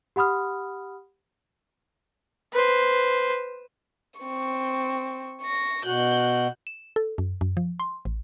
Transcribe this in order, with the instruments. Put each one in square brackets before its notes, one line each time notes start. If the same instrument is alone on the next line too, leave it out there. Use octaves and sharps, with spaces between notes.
[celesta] G4 F#5 B5 D#6 F6
[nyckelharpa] B4 C5
[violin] C4 C#6
C#6 A#6
[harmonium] B2 F#4 [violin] F#6 G6
[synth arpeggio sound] E7
A4
F#2
F#2
F3
C6
A1